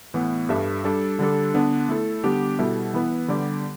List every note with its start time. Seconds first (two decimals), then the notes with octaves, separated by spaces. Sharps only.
0.14 A2 E3 B3
0.49 G2 G3 D4 A4 E5
0.84 G3 D4 A4
1.19 D3 G3 D4 A4
1.54 D3 B3 D4
1.89 A3 E4 A4
2.24 D3 G3 B3 D4 G4
2.59 B2 G3 E4 A4 E5
2.94 E3 B3 E4 B4
3.28 D3 G3 B3 G4 D5